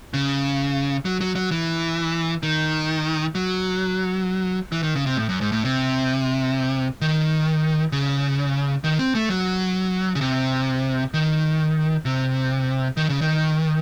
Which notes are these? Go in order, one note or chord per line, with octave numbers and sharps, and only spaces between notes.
C#3
F#3
F#3
F#3
E3
D#3
F#3
E3
D#3
C#3
C3
A2
F#2
G#2
A2
C3
D#3
C#3
D#3
C4
A3
F#3
C#3
C3
D#3
C3
D#3
C#3
D#3